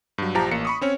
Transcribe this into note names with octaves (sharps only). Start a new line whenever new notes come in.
G2 F#3
A#1 F3 G4 A5 A#5
A1 A#3 C#7
B5 C#6 D#6
C4 C#4 C#5